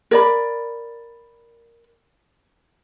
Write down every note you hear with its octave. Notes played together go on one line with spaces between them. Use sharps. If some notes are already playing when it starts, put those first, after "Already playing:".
A#4 D5 B5